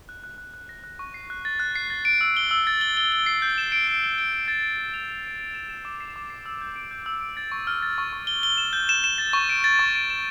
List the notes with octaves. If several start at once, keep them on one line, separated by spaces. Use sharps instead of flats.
F#6
F#6
F#6
F#6
A#6
F#6
C#6
C7
F#6
A6
F#6
C7
A6
D7
E6
G7
E6
A6
G7
G7
G7
C7
G6
E7
D7
D7
G7
D7
D7
A6
D7
D7
F7
F7
D7
D7
E7
E7
D6
C7
D6
C7
E6
G6
D7
G6
E6
D7
A6
C#6
F6
A6
C#6
C#6
G7
G7
E7
G6
E7
E7
A6
C#6
D7
A6
C#6
D7
E7